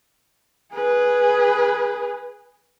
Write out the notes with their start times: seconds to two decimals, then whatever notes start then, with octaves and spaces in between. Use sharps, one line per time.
0.73 G#4 B4